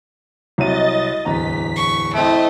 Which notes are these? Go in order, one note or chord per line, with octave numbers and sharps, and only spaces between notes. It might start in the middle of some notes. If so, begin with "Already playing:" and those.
C2 F#3 D#5 A6 D#7
D1 E2 A#5 B6
C#6
A3 C4 E4 D#5